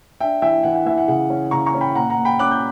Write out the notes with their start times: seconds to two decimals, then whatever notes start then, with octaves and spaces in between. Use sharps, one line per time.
0.20 D4 E5 G5
0.42 E3 E5 G5
0.63 E3 F#5
0.75 F#5
0.86 E3 E5
0.98 F#5
1.08 C#3 F#5
1.30 C#4
1.51 C#3 A#5 C#6
1.66 A#5 C#6
1.74 C#4
1.81 G5 B5
1.95 A#2 F#5 A#5
2.10 F#5 A#5
2.17 A#2
2.25 G5 B5
2.39 C#4 D6 F#6
2.51 G6